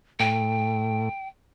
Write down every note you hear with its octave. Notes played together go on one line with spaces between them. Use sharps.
A2 G5